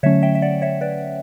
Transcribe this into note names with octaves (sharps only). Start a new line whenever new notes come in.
D3 F#3 A3 C#4 C#5 E5
E5 G5
E5
D5 F#5
C#5 E5
B4 D5